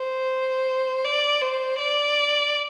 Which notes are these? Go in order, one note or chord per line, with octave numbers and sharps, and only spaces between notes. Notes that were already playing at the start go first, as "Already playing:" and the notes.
Already playing: C5
D5
C5
D5